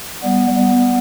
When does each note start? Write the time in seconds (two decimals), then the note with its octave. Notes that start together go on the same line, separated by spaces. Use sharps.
0.23 G3 B3
0.57 G3 B3